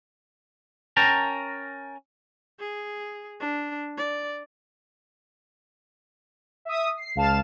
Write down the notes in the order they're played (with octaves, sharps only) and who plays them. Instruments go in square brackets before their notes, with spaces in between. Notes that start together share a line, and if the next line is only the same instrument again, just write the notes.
[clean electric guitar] C#4 A#4 G5 A5 A#5
[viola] G#4
D4
D5
[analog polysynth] E5 D#6
C7
C#2 F5 A5 E7